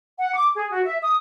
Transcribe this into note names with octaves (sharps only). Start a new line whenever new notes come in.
F#5
D6
G#4
F#4
E5
D#6